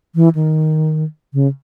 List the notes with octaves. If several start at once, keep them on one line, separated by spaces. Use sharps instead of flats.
E3
D#3
C#3